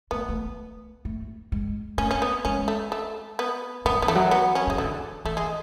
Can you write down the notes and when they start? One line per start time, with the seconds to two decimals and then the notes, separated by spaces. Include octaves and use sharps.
0.11 A3 B3
0.29 A3
1.05 A3
1.52 G#3
1.98 A3 C#4
2.11 C#4
2.22 B3
2.45 G#3 C#4
2.68 A3
2.92 A3
3.39 B3
3.85 G#3 B3
3.95 F#3
4.02 B3
4.06 E3 A3
4.15 F#3
4.31 B3
4.55 C#4
4.67 E3 G#3
4.78 D3 A3
5.25 E3 A3
5.37 G#3